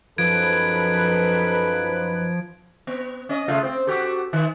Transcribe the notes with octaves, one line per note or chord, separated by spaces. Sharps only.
F#2 F3 D#4 A4 B4 G#6 D7
B3
C#4 D#5
C#3 A3 F4
C4 C5
F#4 G4 A4
D#3